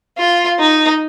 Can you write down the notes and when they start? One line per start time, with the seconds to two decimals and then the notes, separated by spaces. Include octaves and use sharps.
0.18 F4
0.59 D#4